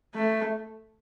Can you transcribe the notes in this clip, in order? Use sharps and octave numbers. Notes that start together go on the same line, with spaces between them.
A3